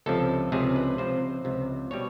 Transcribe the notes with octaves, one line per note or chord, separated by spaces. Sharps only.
C#2 C3 F3 A4
C#2 C3 F3 G#4
B4
C#2 C3 F3 C5
C#2 C3 F3
B2 G3 C#5